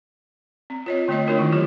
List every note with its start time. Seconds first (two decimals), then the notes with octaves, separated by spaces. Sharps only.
0.70 C4
0.86 F4 C#5 D#5
1.08 D3 A3 A#3 F4 C#5 D#5
1.27 A3 D4 F4 F#4 A#4 C#5
1.38 D#3 D#4 E4
1.52 F#3 F4 G4 C#5